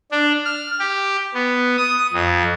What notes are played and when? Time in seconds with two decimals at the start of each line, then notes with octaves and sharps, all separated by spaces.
0.11 D4
0.45 F6
0.79 G4
1.34 B3
1.77 D#6
2.13 F2